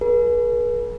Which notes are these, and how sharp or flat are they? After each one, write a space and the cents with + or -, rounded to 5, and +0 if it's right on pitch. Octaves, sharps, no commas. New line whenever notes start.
G#4 +30 B4 -45